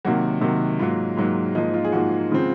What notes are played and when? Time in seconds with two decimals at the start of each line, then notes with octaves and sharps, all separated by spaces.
0.05 C3 D#3 F#3 A#3 F#4
0.41 C3 D#3 F#3 A#3
0.79 G#2 F#3 A#3 F4
1.17 G#2 F#3 A#3
1.55 G#2 F3 A#3 D#4
1.74 F4
1.84 G#4
1.92 G#2 F3 A#3 F#4
2.31 C#3 F3 G#3 C4